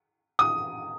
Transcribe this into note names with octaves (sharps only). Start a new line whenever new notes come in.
D#6